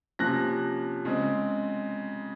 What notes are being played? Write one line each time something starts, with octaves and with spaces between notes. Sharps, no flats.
C3 F3 A#3 C#4 F#6 A#6
C#3 G#3 C4